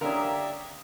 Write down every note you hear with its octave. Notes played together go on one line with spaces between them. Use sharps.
D3 A#3 C#4 D4 G4 A#4 D#5 E5